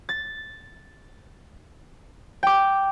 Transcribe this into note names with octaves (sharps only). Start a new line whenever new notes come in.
A6
G5 D6